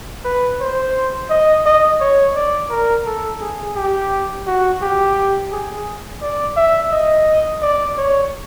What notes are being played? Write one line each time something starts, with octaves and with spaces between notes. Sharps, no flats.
B4
C5
D#5
D#5
C#5
D5
A#4
A4
G#4
G4
F#4
G4
G#4
D5
E5
D#5
D5
C#5